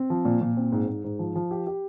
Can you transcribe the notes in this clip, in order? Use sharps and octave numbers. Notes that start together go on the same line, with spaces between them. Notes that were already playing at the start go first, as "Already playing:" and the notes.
Already playing: C4
F3
A#2
A#2
C4
G#2
G#2
G#2
F3
F3
G4
G4